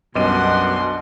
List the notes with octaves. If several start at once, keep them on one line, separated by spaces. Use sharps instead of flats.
B1 F#2 B2 G3 D4 F#5 C6 D#7